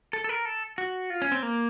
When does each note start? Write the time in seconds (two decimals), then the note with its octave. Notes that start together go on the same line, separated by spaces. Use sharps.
0.13 A4
0.24 A4
0.29 A#4
0.45 A4
0.78 F#4
1.10 F4
1.22 C#4
1.32 C4
1.43 A#3